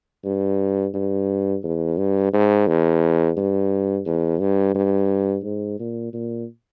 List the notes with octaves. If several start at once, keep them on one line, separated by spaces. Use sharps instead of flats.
G2
G2
E2
G2
G#2
E2
G2
E2
G2
G2
G#2
A#2
A#2